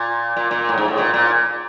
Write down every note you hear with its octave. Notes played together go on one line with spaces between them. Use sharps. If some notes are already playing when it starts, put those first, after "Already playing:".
Already playing: A#2
A#2
A#2
A2
G#2
A2
A#2
A#2